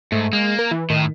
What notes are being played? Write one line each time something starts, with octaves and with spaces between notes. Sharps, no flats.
G#2 A3
G#3 A#3
A#4
E3
A2 D#3